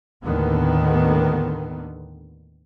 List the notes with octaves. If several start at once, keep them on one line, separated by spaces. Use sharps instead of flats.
D#2 A2 D3 D#3 B3